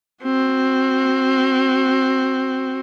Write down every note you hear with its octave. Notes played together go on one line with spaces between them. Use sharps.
C4 F#4